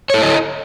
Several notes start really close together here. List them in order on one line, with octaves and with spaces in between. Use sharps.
C#5 A4 E4 D#5